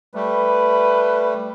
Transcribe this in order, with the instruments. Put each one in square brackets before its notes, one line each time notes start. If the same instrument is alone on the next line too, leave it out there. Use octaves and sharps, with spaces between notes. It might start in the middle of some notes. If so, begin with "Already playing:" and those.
[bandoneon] G3 A3 [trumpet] B4